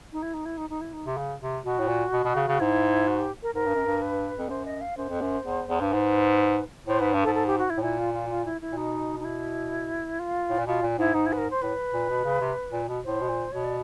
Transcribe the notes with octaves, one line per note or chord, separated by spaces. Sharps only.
D#4
E4
D#4
E4
D#4
D#4
E4
D#4
C3
C#3
C3
B2 F#4
A2
A#2
B2
B2
C#3
C#3
G#2 E4
F#4
G4
A#4
G#2 A#4
G2
F#2
G2
B4
F2
F#2 C5
D#5
F5
F#2 C5
F2
F#2
E2
E2
G2
G#2 B4
A2 C5
G#2 B4
G2
A4
G#2
A4
G4
F#4
E4
A2
A#2 E4
F4
F4
F4
E4
E4
A#2
B2 D#4
D#4
E4
F4
A2
A#2
B2 F4
A#2
G#2 E4
G#2 D#4
E4
B4
A#4
C5
A2 B4
A#2
B2
C#3
C3
A#2
B2
A2 C5
B2
A#2
B2 C#5
D5